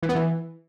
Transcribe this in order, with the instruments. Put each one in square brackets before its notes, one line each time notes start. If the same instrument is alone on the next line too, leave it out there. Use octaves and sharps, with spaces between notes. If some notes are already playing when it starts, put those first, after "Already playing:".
[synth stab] E3
B3
E3